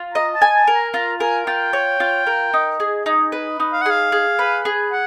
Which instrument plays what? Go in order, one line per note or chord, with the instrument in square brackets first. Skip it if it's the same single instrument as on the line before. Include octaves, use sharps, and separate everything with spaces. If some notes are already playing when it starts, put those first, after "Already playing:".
Already playing: [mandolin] F4
[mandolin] D#5 [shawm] A#5
[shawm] A5
[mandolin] G#5
[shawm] A5
[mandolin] A#4
[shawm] A#5
[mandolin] F4 [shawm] A#5
[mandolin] A#4 [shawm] G#5
[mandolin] F4 [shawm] G5
[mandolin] C#5
F4
A#4
D#4
G#4
D#4
B4
D#4
[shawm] F5
F#5
[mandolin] G#4 [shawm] F5
[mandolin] G#4
B4
G#4
[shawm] F#5